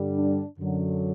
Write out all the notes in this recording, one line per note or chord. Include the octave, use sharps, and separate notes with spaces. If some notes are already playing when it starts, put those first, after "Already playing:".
Already playing: G2 D3 G3
D4
F#2 D3 F#3